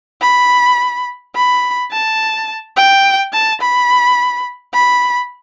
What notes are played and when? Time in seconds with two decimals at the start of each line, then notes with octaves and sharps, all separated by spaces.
0.22 B5
1.36 B5
1.92 A5
2.77 G5
3.33 A5
3.61 B5
4.74 B5